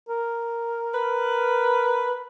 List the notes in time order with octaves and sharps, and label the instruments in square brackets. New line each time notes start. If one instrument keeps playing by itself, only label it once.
[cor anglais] A#4
[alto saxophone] B4